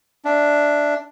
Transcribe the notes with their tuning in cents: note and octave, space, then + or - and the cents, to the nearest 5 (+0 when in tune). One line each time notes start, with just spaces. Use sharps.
D4 +0 E5 +0